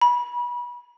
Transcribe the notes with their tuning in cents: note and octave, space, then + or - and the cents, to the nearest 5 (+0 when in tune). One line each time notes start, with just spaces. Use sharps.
B5 -30